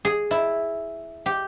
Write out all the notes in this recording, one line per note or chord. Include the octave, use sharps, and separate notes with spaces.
G#4
E4
G4